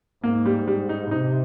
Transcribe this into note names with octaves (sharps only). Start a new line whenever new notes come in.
G#2 A#3
G3
G3
D#4
C3 D#4